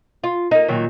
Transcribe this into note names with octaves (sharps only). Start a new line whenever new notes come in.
F4
A#3 D#4
A#2 D#3 F#3